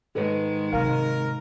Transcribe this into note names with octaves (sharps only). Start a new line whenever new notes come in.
G#2 D#3 G#3 A4 B4
C3 F#3 A#4 F5